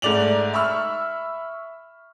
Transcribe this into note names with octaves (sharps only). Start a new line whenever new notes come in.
G#2 A3 D5 F7 F#7
E5 B5 C#6 E6 F6